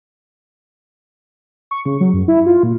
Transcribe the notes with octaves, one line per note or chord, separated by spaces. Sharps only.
C#6
C#3
F#3
F#2
E4
F4
A#2